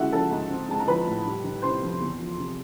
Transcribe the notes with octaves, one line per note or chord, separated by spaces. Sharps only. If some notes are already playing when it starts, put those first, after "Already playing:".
Already playing: G#3 C#4 E4 F#4 E5 F#5
F3 A4 A5
G#2
C4
G#3 A5
A#5
F3 B4 B5
A2
G3
D#3
C3 C5 C6
F2
E2
F3
C3